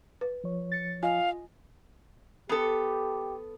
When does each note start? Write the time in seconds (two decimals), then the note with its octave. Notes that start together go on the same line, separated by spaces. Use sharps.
0.21 B4
0.44 F3 C#5
0.72 A6 C#7
1.03 F4 D#5 F5 G#5
2.49 B3 G4 A4